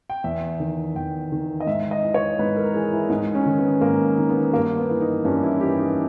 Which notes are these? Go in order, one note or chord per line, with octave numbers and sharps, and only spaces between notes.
G5
E2 E5
D#3
E2 G5
D#3
D#5
G#2 E5
D#5
E3
C#5
G#2 B4
A#4
E3 G#4
E4
G#2 D#4
C#4
D#3
B3
G#2 A#3
D#3
B3
G2 A#3
B3
E3
D#4
G2 C#4
E4
E3 G4
D#4